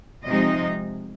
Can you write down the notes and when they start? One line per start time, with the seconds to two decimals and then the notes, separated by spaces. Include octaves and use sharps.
0.24 C3 F3 G#3 D#4 D#5